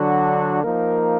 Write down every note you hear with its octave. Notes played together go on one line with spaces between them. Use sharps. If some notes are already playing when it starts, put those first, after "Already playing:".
Already playing: D3 F#3 D4 F#4
F3 A#3 D#4 A#4